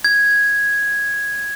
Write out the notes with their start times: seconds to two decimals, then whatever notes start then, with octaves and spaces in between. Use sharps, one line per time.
0.05 G#6